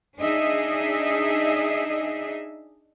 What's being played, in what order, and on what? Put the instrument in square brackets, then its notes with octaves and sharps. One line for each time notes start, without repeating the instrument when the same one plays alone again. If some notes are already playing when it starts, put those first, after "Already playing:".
[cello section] D4 D#4 G#4 D#5 E5